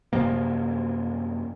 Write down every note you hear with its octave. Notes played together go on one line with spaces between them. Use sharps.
F#2 C3 F3 A#3